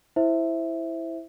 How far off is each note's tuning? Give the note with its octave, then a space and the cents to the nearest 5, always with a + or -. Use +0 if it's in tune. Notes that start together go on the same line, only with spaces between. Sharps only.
E4 +0 C5 +0 E5 +0